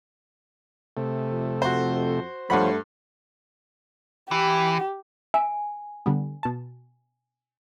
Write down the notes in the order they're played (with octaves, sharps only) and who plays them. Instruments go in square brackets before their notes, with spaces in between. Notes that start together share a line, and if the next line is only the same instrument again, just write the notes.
[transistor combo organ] C3 A3
[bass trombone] F2
[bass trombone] F2 [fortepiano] F#4 C5
[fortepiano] G2 F#5 B5 [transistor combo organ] F3 C5 C#5 [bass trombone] A3
[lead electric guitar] E3 [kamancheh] G4
[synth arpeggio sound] E5 [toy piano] G#5
[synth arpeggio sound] D3 G3 B3
B2 A5